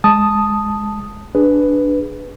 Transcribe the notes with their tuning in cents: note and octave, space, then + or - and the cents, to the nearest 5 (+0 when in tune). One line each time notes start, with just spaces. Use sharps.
G#3 +0 A5 +0 D#6 +0
D4 +0 G#4 +0 B4 +5